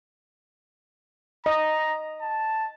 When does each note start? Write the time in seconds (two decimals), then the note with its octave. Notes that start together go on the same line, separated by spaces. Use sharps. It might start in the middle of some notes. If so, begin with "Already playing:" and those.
1.46 D#5 A#5
2.22 A5